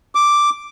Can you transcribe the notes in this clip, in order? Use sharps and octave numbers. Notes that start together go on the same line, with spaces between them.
D6